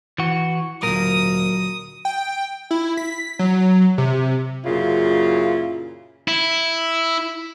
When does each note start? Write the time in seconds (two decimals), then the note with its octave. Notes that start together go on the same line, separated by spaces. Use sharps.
0.18 E3 F#4
0.83 D2 A#2 F#3 A#4 D#6
2.05 G5
2.71 E4
2.97 B6
3.39 F#3
3.98 C3
4.64 F#2 A#2 C#3 E4 F4
6.28 E4